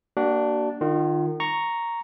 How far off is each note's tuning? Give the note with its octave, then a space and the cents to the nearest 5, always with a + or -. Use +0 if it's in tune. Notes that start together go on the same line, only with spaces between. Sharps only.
A#3 +0 D4 +0 F#4 +35
D#3 -35 F4 +0
A#5 +0 C#6 +0